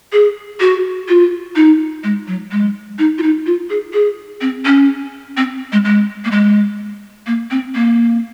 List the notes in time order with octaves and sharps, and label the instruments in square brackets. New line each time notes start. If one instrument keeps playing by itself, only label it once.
[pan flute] G#4
F#4
F4
D#4
G#3
F#3
G#3
D#4
F4
D#4
F4
G#4
G#4
C4
C#4
C4
G#3
G#3
A#3
G#3
A#3
C4
A#3